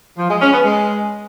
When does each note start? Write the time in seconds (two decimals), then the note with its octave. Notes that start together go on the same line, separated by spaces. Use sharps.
0.18 F3
0.29 G#3
0.41 C#4
0.53 B3
0.65 G#3